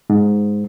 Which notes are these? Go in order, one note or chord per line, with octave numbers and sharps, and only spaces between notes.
G#2